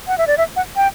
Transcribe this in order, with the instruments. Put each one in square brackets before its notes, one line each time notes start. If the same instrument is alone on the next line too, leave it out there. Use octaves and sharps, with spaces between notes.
[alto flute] F#5
E5
D5
E5
F#5
G5